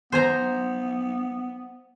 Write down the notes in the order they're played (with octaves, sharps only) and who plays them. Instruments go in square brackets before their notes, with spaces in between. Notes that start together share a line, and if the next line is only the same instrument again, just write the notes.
[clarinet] B3 [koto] C5 G#5 A#5